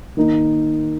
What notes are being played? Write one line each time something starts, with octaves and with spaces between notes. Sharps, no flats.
D#3 A#3 D#4